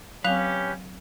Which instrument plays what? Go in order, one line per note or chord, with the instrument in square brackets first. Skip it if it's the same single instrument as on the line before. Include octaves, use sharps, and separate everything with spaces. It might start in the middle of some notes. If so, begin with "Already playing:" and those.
[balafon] F#3 C4 [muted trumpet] C#4 [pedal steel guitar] G4 B4 [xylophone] F5 F#6 F7